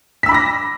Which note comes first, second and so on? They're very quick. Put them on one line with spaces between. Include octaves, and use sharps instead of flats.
B6 E6 B5 D6 A#6